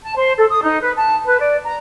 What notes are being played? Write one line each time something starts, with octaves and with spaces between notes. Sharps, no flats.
A5
C5
A4
D#6
D#4
B4
A5
B4
D5
A#5